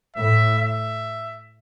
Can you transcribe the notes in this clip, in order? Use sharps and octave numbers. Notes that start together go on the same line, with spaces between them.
A2 E5
E5